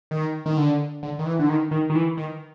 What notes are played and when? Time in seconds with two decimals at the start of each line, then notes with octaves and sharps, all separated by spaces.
0.11 D#3
0.46 D#3
0.57 D3
1.03 D3
1.19 D#3
1.26 E3
1.39 D3
1.49 D#3
1.71 D#3
1.90 D#3
1.95 E3
2.17 D#3